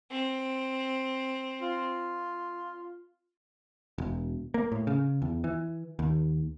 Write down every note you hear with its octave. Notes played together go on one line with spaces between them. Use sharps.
C4
F4
E1
A#3
A2
C#3
E2
E3
D#2